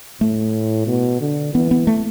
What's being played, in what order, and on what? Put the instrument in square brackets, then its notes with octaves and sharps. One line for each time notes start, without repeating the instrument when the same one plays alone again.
[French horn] A2 [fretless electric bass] A3
[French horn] B2
D3
[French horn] E3 [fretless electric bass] B3
[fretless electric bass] B3
A3